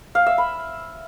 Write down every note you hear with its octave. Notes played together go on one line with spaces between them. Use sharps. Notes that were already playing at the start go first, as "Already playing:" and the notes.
F5
E5
B5